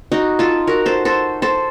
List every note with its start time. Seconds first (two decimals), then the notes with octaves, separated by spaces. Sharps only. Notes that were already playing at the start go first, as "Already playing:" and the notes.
0.12 D#4 F#4
0.39 F4 A4
0.67 F#4 A#4
0.86 A4 C5
1.05 A4 C5
1.42 A4 C5